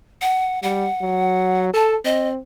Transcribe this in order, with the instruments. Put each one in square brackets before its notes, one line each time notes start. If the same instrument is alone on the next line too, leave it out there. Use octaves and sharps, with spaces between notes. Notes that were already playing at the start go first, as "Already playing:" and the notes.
[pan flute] F#5
[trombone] G3 [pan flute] F#5
[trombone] F#3
[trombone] A4 [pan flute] A5
[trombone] C4 [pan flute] D#5